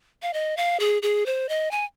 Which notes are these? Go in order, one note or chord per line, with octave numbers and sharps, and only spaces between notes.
F5
D#5
F5
G#4
G#4
C5
D#5
G#5